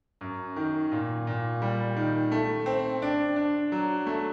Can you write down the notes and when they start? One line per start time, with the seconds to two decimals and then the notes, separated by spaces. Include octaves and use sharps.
0.21 F#2
0.56 D#3
0.92 A#2
1.27 A#2
1.62 G3
1.97 D#3
2.32 A3
2.66 C4
3.02 D4
3.36 D4
3.72 F#3
4.07 A3